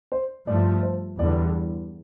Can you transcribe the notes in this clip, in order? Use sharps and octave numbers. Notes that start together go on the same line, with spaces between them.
C5
G2 F3 A3 D5
C5
E2 D3 G3 D5